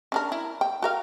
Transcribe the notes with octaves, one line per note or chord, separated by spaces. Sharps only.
C#4 D4 A#4
E4
G5
F#4 A#4 F5